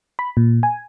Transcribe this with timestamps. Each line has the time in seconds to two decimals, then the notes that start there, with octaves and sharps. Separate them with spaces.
0.19 B5
0.37 A#2
0.63 G#5